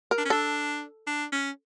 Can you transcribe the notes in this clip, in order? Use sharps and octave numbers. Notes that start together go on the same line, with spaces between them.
A#4
D4
C#4
D4 A4
D4
C#4